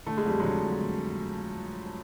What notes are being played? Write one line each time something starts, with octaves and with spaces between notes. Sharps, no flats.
D3 A3
G#3
F2 G3
D3 F#3 G#3
F2
D3